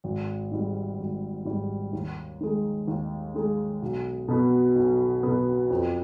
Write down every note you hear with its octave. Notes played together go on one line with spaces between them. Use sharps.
G#1
G#2 G3
G#1
G#2 G3
D#2
D#3 G#3
D#2
D#3 G#3
B1
B2 B3
B1
B2 B3
F2